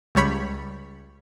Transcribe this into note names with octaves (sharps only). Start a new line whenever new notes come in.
C#2 G3 C#5 B5 C#7